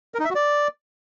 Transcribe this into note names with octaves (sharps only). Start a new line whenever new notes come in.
A#4
D#4
E5
F#4
D5